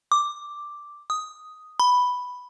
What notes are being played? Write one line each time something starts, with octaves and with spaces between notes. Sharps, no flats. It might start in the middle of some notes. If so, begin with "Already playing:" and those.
D6
D#6
B5